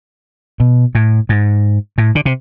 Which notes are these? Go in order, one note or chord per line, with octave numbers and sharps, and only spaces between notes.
B2
A2
G#2
A2
D3
C3